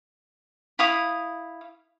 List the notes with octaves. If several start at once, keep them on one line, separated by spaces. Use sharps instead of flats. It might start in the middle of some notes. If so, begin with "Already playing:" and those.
E4 F5 D#6